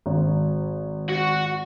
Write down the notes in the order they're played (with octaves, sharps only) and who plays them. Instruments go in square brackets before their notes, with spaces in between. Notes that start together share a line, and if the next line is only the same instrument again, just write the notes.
[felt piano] G#1
[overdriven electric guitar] F#4